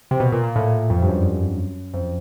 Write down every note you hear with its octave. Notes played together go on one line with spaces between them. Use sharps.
C3
B2
A#2
A#2
A2
F2
G2
F#2
F2